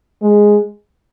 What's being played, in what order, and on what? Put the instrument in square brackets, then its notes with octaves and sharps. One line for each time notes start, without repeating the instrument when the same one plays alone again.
[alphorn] G#3